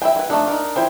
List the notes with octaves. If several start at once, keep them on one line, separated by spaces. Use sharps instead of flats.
D4 E4 E5 G5
E4 B4
A3 D4 D#4 A4
D#4 A#4
E4 C5 G5